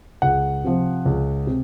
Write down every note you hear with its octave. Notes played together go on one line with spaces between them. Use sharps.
C#2 F#5
C3 F3
C#2
C3